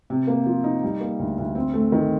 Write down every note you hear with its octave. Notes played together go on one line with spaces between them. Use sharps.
C3
A#3
F3
D#4
G3
A#3
D2
D2
C4
A3
D#3